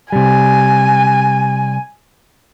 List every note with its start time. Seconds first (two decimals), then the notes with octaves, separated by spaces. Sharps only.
0.12 C3 G3 G#5